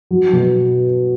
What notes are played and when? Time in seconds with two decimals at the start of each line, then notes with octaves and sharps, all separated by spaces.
0.11 F#3
0.33 B2